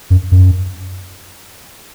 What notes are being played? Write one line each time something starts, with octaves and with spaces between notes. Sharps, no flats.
F#2
F#2